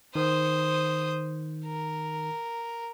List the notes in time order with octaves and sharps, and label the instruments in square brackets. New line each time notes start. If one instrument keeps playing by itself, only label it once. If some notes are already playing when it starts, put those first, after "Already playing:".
[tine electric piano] D#3 [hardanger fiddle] C5 D#6
[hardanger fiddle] A#4